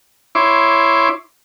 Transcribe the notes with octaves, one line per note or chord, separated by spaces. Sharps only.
E4 C#5 C6 D6